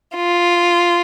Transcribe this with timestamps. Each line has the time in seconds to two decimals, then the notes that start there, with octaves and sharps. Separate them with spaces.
0.17 F4